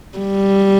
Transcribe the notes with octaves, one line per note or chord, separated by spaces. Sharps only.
G3